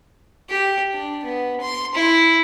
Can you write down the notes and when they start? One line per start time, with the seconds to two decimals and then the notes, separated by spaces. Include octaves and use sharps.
0.50 G4
0.94 D4
1.25 B3
1.61 C6
1.95 E4